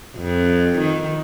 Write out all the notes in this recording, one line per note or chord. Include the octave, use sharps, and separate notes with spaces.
F2
D#3